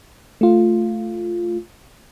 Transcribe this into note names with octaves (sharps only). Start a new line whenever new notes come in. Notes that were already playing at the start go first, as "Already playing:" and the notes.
A3 F4